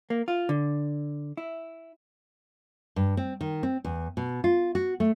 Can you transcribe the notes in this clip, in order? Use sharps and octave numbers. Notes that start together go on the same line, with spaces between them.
A#3
F4
D3
E4
G2
C4
D#3
C4
E2
B2
F4
F#4
A3